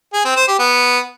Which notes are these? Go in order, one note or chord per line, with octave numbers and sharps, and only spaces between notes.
G#4
C4
C5
G4
B3